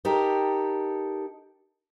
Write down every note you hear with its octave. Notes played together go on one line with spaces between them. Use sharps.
D#4 G4 A4 A#4